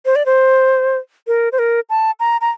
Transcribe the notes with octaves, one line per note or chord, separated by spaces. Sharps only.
C5
D5
C5
A#4
C5
A#4
A5
A#5
A#5